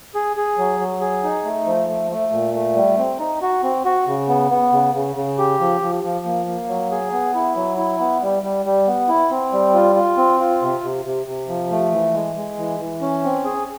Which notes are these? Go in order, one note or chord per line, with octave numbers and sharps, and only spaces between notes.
G#4
G#4
F#3
F#3
G#4
D#4
A3
F3
A3
A3
A#2
A3
G3
C4
D#4
F#4
C4
F#4
C#3
B3
B3
C#3
C#3
C#3
G4
F3
F3
F3
A#3
A#3
F#3
G#4
B3
E4
F#3
E4
B3
G3
G3
G3
B3
E4
C4
G3
F4
F4
C4
F4
C3
C3
C3
C3
F3
A3
E3
G#3
G#3
E3
E3
C#4
C4
G#4